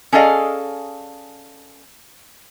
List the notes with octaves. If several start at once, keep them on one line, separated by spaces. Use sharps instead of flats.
C#4 G#4 A4 D5 D#5 F5